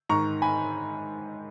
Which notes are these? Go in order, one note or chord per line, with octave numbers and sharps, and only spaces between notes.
G#2 D#3 A#5 C#6
G#5 B5